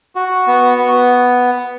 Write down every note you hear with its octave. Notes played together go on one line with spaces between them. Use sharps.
F#4
B3
B3